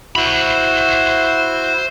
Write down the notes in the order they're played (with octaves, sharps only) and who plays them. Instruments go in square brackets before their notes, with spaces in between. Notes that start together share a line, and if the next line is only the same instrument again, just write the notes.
[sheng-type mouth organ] E4 F#4 [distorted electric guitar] C5 B5